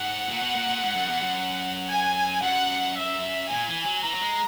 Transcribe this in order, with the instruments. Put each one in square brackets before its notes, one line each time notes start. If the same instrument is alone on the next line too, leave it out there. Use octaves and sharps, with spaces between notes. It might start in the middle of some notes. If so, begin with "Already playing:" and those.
Already playing: [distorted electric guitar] G#2 [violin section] F#5
[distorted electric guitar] A#2
B2
A#2
A#2
G#2
F#2
E2
F#2
[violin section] G#5
[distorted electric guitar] F#2 [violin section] F#5
[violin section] E5
[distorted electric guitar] A#2 [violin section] G#5
[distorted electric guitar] E3
F#3
[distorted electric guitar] E3 [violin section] A#5
[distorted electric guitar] F#3
G#3